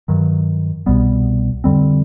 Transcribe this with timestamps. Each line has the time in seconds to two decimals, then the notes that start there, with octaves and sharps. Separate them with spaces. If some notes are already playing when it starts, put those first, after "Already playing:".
0.08 G2 D#3 F#3
0.86 C2 B2 G3 B3
1.64 F2 D3 G3 C4